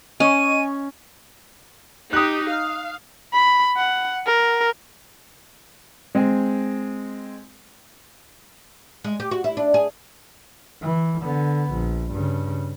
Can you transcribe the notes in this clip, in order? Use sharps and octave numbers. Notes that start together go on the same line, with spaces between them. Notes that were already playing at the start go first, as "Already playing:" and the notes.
C#4 D#5 G#5 C#6 D#7
D#4 G4 D#6 F#6
F5
B5
F#5
A#4
G#3 C4 G#4
G#3
G4
F#4
E4
D4
G#4
E3
D3 B3
A#1
G2 C#3